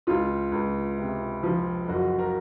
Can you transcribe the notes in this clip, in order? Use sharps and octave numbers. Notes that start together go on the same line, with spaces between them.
C#2 F4
C#2
C3
F3
F#1 F#4
A#4